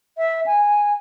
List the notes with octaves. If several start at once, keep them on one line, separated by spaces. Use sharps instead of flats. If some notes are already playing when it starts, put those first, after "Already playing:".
E5
G#5